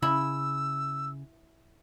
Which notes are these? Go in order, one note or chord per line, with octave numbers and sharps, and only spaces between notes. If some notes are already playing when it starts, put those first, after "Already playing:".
C#3 E4 E6